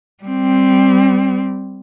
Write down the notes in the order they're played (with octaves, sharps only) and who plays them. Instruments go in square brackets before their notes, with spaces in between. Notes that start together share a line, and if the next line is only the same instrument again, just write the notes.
[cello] G3 C4